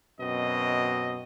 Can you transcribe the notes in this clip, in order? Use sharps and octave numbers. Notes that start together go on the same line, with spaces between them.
F#2 B2 C4 D#5